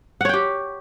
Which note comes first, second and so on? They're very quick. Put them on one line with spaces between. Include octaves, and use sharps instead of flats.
F#5 C#5 G5 G4